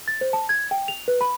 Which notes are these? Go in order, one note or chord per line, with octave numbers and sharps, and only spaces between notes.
A6
C5
A5
G#6
G5
F7
B4
B5